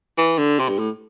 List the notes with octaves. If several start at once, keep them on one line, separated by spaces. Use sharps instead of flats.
E3
D3
C3
G2
A2